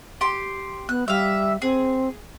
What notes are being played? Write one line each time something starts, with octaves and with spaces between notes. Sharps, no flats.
G4 C6
B3 F#6
G3 E5 F5
C4 G#4